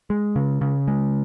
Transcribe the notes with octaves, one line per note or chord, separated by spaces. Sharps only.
G#3
C#3
C#3
G#3